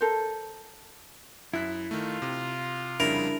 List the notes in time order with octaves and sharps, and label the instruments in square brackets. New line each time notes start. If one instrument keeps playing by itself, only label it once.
[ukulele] A4 A#4 C5
[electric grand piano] F#2 F#6 B6 [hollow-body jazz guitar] E4
[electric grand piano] D#3 A3 [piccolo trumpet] F4
[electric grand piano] C3
[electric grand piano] F2 C#3 G3 [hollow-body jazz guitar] D4 E4 [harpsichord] A#4